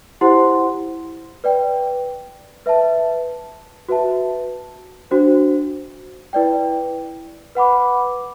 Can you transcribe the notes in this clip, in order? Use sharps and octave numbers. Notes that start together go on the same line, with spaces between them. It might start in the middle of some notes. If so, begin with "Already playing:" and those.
E4 G4 C5 F#5 C6
B4 D5 G5
B4 E5 A5
F#4 B4 E5 A5
D4 F#4 C5
E4 B4 D5 G5
B4 F#5 B5 D6